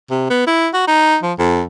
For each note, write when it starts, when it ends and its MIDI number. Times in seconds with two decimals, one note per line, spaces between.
0.10 0.26 48
0.30 0.45 59
0.47 0.68 64
0.74 0.85 66
0.88 1.18 63
1.23 1.33 53
1.39 1.63 41